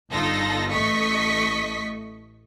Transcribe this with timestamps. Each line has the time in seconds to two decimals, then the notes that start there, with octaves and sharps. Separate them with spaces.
0.12 G1 D#4 F4 A4 A#6
0.71 A1 A3 D#5 C#6 B6